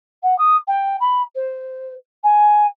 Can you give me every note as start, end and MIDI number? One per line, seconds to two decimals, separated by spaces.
0.23 0.37 78
0.38 0.56 87
0.67 0.96 79
1.00 1.22 83
1.35 1.94 72
2.23 2.66 80